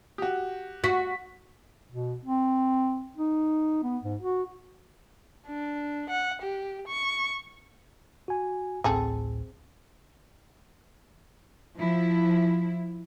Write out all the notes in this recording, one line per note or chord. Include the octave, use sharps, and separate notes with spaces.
F#4 G4
F#4 B6
B2
C4
D#4
B3
G#2
F#4
D4
F#5
G4
C#6
F#4 G#5
A1 D2 A2 C4 G#4 A4
F3 E4